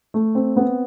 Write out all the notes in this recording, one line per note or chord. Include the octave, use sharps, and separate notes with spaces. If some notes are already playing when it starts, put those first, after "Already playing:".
A3
C4
B3